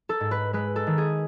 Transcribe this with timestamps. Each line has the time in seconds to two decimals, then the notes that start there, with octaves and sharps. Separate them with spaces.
0.09 A4
0.21 G#2
0.31 B4
0.53 G#3 B4
0.76 A4
0.87 D#3
0.98 G#4